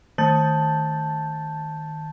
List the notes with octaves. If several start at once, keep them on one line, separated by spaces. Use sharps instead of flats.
D#3 A5 G6 A6